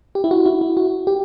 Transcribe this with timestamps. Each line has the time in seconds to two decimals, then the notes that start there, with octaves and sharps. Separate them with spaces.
0.15 G4
0.24 E4
0.31 F#4
0.46 E4
0.61 E4
0.77 F#4
1.07 G4